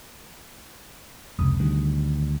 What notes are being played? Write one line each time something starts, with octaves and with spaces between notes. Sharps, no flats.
F1 C#2 C3 D#6
D2 D3 D#3 G3